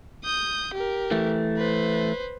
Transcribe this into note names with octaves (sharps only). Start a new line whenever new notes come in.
D#6 G6
G4 A#4
E3 A3
B4 C5